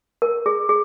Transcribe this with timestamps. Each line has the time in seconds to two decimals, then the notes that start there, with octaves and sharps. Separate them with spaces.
0.22 A#4
0.46 G#4
0.69 G#4